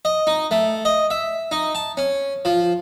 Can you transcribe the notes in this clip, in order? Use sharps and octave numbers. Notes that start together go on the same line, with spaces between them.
D#5
D#4
A3
D#5
E5
D#4
A5
C#4
F3